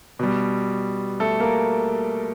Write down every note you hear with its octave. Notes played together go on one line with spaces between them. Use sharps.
B2 G3
A3 A4
A#3 A#4